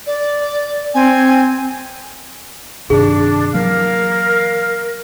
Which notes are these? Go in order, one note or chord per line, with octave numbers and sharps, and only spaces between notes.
D5
C4 G#5
G2 C3 D#3 D4 G#4
E3 F#3 A#3 A#4 F5